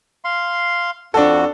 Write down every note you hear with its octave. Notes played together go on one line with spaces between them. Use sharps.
F5 C6
F2 D4 F#4 A4